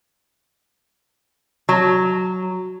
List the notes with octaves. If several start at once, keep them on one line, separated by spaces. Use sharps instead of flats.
F#3